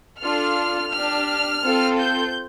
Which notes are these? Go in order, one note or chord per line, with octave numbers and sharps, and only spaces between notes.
D4 F4 A4 F6
D4 G4 F6
C4 F4 A4
G6